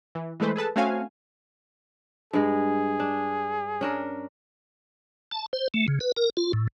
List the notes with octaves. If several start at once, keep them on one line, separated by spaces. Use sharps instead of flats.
E3
E3 G#3 A3 B4 C5
G#4 A4 B4 A5
A3 C4 C#4 F#4 F5 G#5
G2 G#3 G#4
D4
C#4 D4 A#4
A5
C5
A3
C#3
B4
A#4
F4
A2